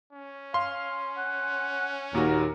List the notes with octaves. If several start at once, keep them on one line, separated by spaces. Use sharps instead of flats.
C#4
F5 C6
F#5
D#2 A#2 F#4 A#4